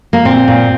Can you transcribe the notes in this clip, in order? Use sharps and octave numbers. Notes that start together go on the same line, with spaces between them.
A#3
A#2 C4
A#2